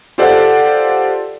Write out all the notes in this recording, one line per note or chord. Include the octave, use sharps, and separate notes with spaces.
F4 G4 A4 C5 D5 F#5